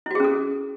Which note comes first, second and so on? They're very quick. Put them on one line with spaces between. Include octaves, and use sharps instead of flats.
E4 F#4 G#4 C#4 A4